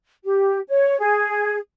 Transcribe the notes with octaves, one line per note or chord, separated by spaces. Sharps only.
G4
C#5
G#4